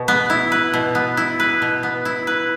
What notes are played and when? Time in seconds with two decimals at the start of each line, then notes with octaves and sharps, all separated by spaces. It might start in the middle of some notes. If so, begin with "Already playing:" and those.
Already playing: B2
0.08 B3
0.30 E4
0.52 B4
0.74 B2
0.95 B3
1.17 E4
1.40 B4
1.62 B2
1.83 B3
2.05 E4
2.27 B4